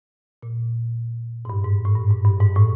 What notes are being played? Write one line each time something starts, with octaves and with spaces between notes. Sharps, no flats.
A#2
G#2
G2
G#2
A2
G2
G#2
G2
G#2
A2